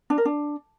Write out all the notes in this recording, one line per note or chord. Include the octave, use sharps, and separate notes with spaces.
D4
A#4
D4